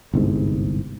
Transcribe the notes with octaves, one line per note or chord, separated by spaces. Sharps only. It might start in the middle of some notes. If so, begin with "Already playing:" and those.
G1 C2 G#2